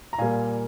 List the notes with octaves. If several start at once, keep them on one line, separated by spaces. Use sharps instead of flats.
A#5
A#2 G3 A#3 F5 G#5